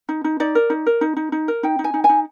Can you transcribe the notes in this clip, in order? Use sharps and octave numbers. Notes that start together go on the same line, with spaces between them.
D#4
D#4
D#4 D5
A#4
D#4
A#4
D#4
D#4
D#4
A#4
D#4 G5
D#4
G#5
D#4
G#5
D#4